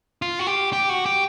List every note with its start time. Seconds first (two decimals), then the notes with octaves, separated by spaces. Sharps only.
0.22 F4
0.39 F#4
0.47 G4
0.73 G4
0.89 F#4
1.06 G4